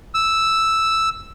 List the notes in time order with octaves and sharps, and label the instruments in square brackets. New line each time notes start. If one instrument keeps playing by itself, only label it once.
[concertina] E6